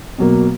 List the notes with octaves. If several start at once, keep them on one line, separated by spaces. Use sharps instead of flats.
B2 F#3 A#3